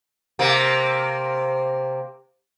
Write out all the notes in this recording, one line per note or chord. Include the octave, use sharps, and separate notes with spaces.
C3 A#3